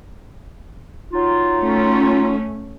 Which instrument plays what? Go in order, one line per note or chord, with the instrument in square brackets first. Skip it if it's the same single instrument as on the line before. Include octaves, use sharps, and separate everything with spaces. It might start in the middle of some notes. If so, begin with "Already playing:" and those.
[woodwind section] F#3 D#4 F4
[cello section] A3 C#4